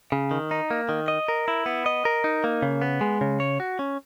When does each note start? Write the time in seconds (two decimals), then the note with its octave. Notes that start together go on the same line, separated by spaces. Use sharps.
0.12 C#3
0.31 D#3
0.51 D#4
0.71 A#3
0.89 D#3
1.08 D#5
1.28 A#4
1.48 E4
1.66 B3
1.86 D#5
2.05 A#4
2.24 D#4
2.44 A#3
2.62 C#3
2.81 B3
3.01 G#3
3.21 C#3
3.40 C#5
3.60 F#4
3.79 C#4